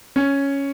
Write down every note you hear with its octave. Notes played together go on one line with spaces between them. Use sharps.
C#4